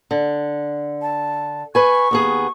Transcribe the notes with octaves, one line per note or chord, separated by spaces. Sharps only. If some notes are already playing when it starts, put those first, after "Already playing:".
D3
A5
B4 G#5 C#6
D#2 B3 G#4